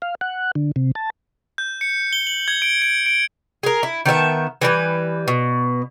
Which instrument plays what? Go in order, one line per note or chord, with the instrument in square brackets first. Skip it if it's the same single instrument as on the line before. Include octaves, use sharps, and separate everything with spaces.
[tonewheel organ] F5
F#5
D3
C3
A5
[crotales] G6
C#7
G7
F#7
G#6
D7
D7
D7
[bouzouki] G#4 A#4
E4
D#3 B3 E5 A5
E3 G3 A4 B4
B2